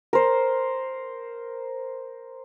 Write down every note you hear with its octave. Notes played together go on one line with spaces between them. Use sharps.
A#4 C5